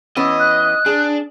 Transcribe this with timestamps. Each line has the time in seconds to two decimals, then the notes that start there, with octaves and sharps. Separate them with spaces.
0.16 E3 B3 C#4 D#5
0.40 F#6
0.86 D4 G#4